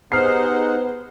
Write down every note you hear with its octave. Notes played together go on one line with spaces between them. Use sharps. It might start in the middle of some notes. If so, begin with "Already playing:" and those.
B3 D#4 G4 G#4 C5 F#5 F6 C7